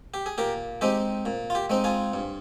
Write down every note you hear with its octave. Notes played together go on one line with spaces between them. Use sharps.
G4
G#4
A#2 G4 A#4
G#3 C4 D#4 G4
A#2
F4
G4
G#3 C4 D#4
F4 G#4
G2